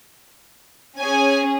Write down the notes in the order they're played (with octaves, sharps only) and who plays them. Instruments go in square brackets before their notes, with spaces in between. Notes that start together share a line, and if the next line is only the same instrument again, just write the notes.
[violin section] C#4 G#4 G#5